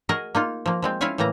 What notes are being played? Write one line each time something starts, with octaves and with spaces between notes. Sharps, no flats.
F#4 G#4 A#4 D#5
A#3 D#4 F4
F3 A#3
F3 G#3 C4
C#4 E4 F4 C#5 F5 G#5
A2 C#3 E3 A#3 A#5